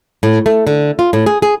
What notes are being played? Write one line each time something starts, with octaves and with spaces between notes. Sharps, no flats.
A2
A3
D3
F4
A2
G#4
G#4